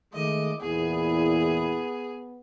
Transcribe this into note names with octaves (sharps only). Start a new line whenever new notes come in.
D#3 G#3 A3 D#5 D6
E2 A#2 B3 E4 G#4